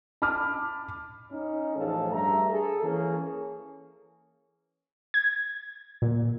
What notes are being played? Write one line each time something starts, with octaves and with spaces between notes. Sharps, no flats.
A5 B5 D6 F6
C#4 D#4
A1 D2 F3 G#4 A4
G2 A3 E5 A#5
G#4 A4
E3 A#3 C#4 G#4
G#6
A#2